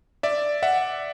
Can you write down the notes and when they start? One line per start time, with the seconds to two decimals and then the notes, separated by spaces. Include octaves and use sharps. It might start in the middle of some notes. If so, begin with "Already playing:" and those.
0.23 D5 E5
0.63 E5 F#5